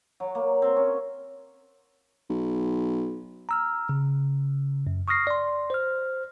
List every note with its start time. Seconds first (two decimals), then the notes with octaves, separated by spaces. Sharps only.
0.20 F#3
0.35 A#3
0.62 C4
0.76 C#4
2.30 B1
3.49 A#5 E6 F6
3.89 C#3
4.87 F#2
5.08 C#6 D#6 F6 A#6 C7
5.27 D5 C6
5.70 C5 F6